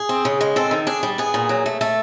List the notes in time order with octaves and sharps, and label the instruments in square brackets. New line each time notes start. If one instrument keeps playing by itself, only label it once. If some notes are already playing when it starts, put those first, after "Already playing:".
Already playing: [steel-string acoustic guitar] G#4
C4
C#3
G#3
C4 A4
D#3
D4 G#4
G3
B3 G#4
A#2
F#3
A3
A3 A4